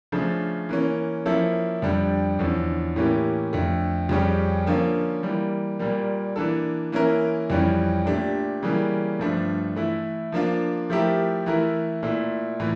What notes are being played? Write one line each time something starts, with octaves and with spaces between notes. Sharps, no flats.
C#3 F3 A3 D4
E3 A#3 C#4
F3 A#3 C#4 E4 A4
F2 D3 G3 D4
E2 D3 F3 C#4
A2 E3 A#3 C#4 G4
F2 D3 A3
F2 C#3 G3 C#4 G4
D3 F3 A#3 C#4 F4
E3 G3 A#3
A#2 G3 A#3
E3 A#3 D4 A4
E3 A#3 C#4 E4 A#4
F2 E3 G3 C#4
A#2 A3 D4 G4
C#3 E3 G3 A#3
G2 F3 A3 D4
E3 A3 E4
F3 A#3 D4 F4
F3 A3 E4 G4 A#4
E3 A3 E4 A#4
A#2 A3 E4
A2 E3